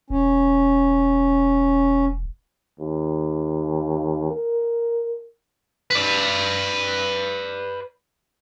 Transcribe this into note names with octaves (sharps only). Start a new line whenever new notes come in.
E1 C#4
D#2
A#4
B4 D5